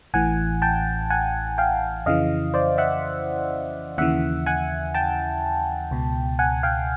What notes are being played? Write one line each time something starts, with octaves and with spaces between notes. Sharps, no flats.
A1 A2 E3 F#5 G#5
G5 A5
F#5 G#5
F5 G5
F2 C#3 E3 D#5 F5
C5 D5
E5 F#5
D#2 C#3 E3 E5 F#5
F#5 G#5
G5 A5
C#2 B2
F#5 G#5
F5 G5